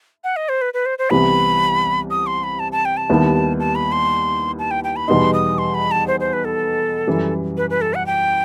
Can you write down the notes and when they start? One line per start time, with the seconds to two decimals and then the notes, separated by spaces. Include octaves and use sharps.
0.24 F#5
0.36 D#5
0.49 C5
0.61 B4
0.74 B4
0.86 C5
0.98 C5
1.10 C2 C3 E3 G3 B3 B5
2.10 D#6
2.27 C6
2.44 B5
2.60 A5
2.72 A5
2.85 G5
2.97 A5
3.09 D#2 D#3 G3 B3 E4
3.60 A5
3.75 B5
3.92 C6
4.59 A5
4.71 G5
4.84 G5
4.96 B5
5.08 E2 B2 G3 B3 D#4 C6
5.34 D#6
5.58 C6
5.74 B5
5.91 A5
6.08 C5
6.20 C5
6.33 B4
6.45 A4
7.07 F#2 E3 G3
7.57 B4
7.70 B4
7.81 A4
7.94 F#5
8.06 G5